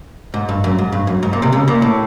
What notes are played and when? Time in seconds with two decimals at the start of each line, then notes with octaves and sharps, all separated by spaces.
0.34 G#2
0.49 G2
0.64 F#2
0.78 G#2
0.92 G2
1.07 F#2
1.23 G#2
1.33 A#2
1.42 C2 C3
1.52 C#2 C#3
1.68 A#2
1.82 A2